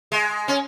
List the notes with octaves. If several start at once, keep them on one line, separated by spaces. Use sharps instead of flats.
G#3
C#4